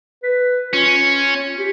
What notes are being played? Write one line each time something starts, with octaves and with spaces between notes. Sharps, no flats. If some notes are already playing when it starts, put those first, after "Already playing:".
B4
C#4 F4
G4